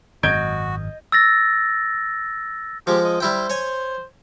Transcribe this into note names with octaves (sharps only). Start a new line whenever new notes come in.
G#1 F#2 F#4 D#5 G6 G#6 D7
E6 A6 A#6
F3 G#3 G4
D#5
G3 E4 C5 G5
C#5 G#5